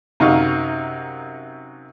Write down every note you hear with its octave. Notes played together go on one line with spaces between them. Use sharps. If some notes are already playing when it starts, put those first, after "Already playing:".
F#2 C3 D#4 F#4 F5 C#6